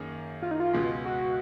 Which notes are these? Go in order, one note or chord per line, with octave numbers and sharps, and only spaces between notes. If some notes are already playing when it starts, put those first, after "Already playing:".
Already playing: F#2 D#3 A#3 C#4 G#4
F4
D#4
F4
C#2 B2 G#3
F#4